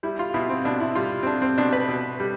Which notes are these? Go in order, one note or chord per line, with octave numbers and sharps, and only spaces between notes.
G3 E4
F4
B2 E4
C4
B2 D4
E4
G3 F4
C4
G3 D4
C4
B2 D4
B4
B2
G3